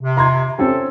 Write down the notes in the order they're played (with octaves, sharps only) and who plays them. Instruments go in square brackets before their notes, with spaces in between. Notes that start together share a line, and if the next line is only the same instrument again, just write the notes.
[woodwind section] C3
[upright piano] A#5 C6 G#6
[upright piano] C4 C#4 G4 [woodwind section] A4